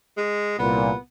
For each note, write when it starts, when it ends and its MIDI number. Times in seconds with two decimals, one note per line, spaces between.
0.17 0.59 56
0.59 0.91 36
0.59 0.91 46
0.59 0.95 59